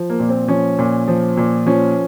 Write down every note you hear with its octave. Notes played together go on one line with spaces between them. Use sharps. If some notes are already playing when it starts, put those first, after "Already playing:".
Already playing: F3
A#3
A#2
C4
F3 C#4
A#2
F3
A#2
F3 C#4